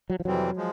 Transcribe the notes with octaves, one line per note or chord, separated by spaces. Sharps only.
F#3
F3
F2 C3 E3 F#3 G3 C4
F3 G#3